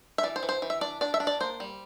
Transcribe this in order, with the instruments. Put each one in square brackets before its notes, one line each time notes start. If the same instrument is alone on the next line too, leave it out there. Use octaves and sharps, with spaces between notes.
[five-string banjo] E5
E3 D5
C5
E3
C5
E3
E5
D4 D5
D4 D5
E5
D4
D5
A#3 C5
G3